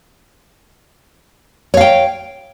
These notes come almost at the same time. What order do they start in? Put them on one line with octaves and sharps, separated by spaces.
C#5 F5 G5